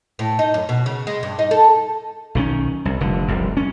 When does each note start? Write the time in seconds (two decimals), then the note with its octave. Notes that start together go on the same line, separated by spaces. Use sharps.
0.19 A2
0.39 D#4
0.54 F#2
0.69 B2
0.86 C#3
1.07 G#3
1.23 G2
1.39 D#4
1.51 A4
2.35 B1 D#3 F#3 C#4
2.85 C2
3.01 F1 D3
3.28 F1 C2 F#2
3.57 C#4